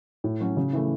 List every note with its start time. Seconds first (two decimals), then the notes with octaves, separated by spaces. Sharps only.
0.24 A2
0.40 F#3 C#4
0.57 C#3
0.73 E3 A3